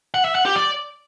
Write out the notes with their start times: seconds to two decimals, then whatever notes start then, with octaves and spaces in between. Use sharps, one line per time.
0.14 F#5
0.25 E5
0.35 F#5
0.45 G4
0.56 D5